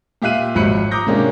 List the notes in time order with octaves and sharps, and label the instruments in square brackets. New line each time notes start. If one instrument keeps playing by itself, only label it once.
[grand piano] A#2 G4 E5 F5 F#6 D#7
G#1 F3 F#3 B5 F#6 C#7
A#5 D6 D#6 G6 A#6
C3 G#3 A#3 C#4 D4 G4